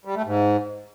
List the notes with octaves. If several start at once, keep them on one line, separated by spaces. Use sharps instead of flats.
G3
A3
G#2